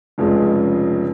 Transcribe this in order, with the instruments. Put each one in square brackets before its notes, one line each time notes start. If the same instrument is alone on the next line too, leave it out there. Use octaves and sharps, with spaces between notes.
[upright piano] F1 F2 C#3 G#3 C#4